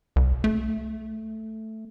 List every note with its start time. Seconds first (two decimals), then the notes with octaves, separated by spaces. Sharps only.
0.16 C2
0.44 A3